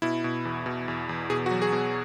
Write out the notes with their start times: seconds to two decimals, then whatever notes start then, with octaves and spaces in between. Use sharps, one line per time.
0.02 B2 E4
0.24 B2
0.45 E2
0.66 B2
0.88 E2
1.09 E2
1.30 B2 G#4
1.46 F#4
1.51 F#3
1.62 G#4
1.72 B2